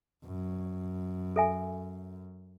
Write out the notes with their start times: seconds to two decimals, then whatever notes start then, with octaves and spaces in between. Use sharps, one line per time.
0.25 F#2
1.36 A4 E5 G#5